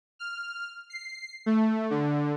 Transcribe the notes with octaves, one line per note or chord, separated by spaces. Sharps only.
F6
C7
A3
D3